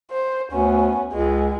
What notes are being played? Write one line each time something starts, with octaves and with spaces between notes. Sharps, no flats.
C5
D2 B3 C#4
C#2 G#3